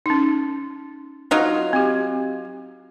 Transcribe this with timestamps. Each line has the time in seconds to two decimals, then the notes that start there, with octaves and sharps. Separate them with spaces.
0.06 C#4 D#4
1.31 F#3 D#4 F4
1.73 C4 G4